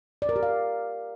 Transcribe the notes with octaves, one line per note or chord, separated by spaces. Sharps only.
D5
A#4
G4
F5